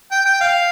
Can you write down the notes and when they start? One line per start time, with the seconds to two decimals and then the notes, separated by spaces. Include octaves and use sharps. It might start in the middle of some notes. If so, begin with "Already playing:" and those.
0.11 G5
0.26 G5
0.41 F5